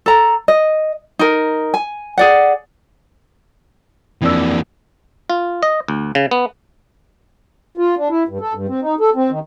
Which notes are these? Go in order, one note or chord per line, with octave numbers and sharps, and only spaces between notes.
A4 A#5
D#5
D#4 A#4
G#5
G#4 D5 F#5
F2 E3 A#3 D4 E6
F4
D#5
D2
C#3
B3
F4
D4
E4
G2
A4
G2
C4
D#4
A4
C4
D#3